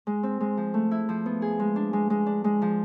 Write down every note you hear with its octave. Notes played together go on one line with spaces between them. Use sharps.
G#3
C4
G#3
F3
A3
E4
F3
B3
G#4
G#3
D4
G#3
G#3
D4
G#3
F3